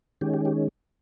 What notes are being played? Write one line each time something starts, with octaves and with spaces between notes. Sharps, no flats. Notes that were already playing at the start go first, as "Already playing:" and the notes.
D#3 G#3 C#4 G4
G4
G4